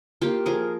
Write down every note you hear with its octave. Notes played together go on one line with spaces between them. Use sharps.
A#3 F4 G4
F3 G#4 A#4